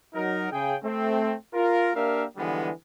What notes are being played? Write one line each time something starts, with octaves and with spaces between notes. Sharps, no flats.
F#3 D#4 A#4
C#3 G#4 G5
A3 C4
F4 A#4
A#3 D4 G4 A#4 E5 F5
D3 E3 F3 G3 G#3 B3